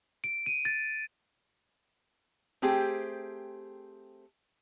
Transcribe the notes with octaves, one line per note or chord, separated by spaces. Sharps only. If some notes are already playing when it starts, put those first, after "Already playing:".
D7
D#7
A6
A3 C4 G4 G#4 C5